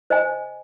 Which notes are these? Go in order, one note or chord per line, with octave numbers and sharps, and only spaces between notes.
C5 D#5 G#5